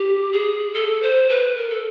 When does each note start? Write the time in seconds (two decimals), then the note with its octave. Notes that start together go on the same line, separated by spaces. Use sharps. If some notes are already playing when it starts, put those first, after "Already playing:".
Already playing: G4
0.32 G#4
0.74 A4
1.02 C5
1.29 B4
1.57 A#4
1.70 A4